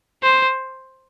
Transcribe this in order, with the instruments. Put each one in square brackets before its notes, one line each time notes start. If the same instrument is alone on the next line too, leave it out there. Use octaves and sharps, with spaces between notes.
[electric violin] C5